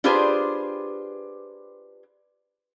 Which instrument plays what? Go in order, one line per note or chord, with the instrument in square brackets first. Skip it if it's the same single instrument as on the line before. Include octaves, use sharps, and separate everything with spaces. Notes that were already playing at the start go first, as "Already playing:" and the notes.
[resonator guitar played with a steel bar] D4 F4 G4 G#4 B4 C5